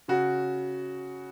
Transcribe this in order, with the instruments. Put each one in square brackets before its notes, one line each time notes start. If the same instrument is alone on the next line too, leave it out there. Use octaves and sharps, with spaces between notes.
[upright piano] C#3 F#4